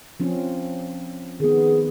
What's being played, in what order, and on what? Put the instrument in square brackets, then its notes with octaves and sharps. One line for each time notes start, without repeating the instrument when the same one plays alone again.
[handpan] F3 C4 C#4
[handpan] D#3 B3 [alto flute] G#4